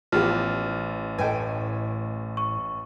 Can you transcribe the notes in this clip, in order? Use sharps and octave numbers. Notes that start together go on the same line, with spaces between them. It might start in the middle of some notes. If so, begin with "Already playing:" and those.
A1 F3 B3 G4 F6
A2 A4 B4 D#5 G5 G#5
C#6